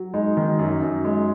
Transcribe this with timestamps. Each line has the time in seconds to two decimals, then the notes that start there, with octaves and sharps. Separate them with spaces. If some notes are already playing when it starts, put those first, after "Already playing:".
Already playing: F#3
0.14 G#3 D#4
0.37 D#3
0.59 F#2
0.82 F#2
1.04 G#3